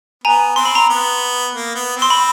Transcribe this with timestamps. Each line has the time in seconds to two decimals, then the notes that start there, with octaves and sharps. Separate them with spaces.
0.24 B3 G#5 A#5
0.56 C4 C6
0.65 B5
0.75 A#5 C6
0.89 B3
1.54 A#3
1.75 B3
1.97 C4 C6
2.10 B5